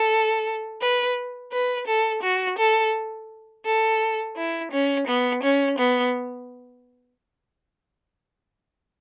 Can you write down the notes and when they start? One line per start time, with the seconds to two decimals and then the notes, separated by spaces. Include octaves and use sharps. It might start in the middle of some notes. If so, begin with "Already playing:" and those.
Already playing: A4
0.81 B4
1.52 B4
1.87 A4
2.22 F#4
2.58 A4
3.65 A4
4.37 E4
4.72 C#4
5.07 B3
5.43 C#4
5.78 B3